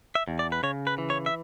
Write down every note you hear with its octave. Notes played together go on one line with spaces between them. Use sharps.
E5
E2
D5
B4
C#3 C#5
B4
E3
C#5
E5